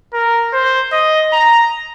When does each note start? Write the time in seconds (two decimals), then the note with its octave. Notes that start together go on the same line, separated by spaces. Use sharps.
0.13 A#4
0.53 C5
0.92 D#5
1.32 A#5